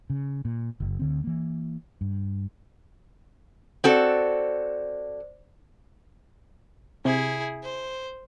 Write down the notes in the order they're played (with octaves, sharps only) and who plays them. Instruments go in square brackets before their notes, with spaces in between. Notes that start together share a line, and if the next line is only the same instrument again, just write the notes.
[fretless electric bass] C#3
A#2
F#1
D2 D3 C4
E3 A#3
G2
[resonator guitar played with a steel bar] C4 F#4 A4 [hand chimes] C5 D5
[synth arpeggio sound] C3 [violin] E4 G#4
[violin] C5